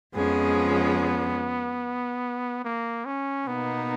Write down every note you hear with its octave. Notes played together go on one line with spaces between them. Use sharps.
F2 F3 G#3 B3 C#4 G#4
A#3
C#4
B2 A#3 B3 D#4